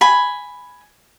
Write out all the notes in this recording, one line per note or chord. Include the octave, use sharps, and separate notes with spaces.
G#5 B5